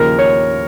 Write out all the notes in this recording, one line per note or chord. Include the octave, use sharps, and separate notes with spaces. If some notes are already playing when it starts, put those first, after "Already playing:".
Already playing: D#2 C#3 F3 A#4
C#5